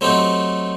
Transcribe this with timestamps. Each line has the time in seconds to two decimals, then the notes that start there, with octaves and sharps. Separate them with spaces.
0.01 F#3 A3 C4 D#4 G4